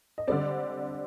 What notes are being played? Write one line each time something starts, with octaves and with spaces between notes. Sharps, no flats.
D#5
D3 G3 C4 D5